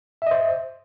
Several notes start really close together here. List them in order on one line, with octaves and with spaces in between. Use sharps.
E5 D#5 C5